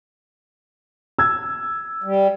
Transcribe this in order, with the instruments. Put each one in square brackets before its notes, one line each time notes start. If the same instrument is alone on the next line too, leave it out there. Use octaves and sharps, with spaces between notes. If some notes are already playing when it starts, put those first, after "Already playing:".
[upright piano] E6 G#6
[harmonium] G3